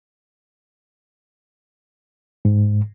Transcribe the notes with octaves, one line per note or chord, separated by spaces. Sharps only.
G#2